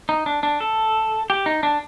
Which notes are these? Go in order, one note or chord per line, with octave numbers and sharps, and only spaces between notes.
D#4
D4
D4
A4
G4
D#4
D4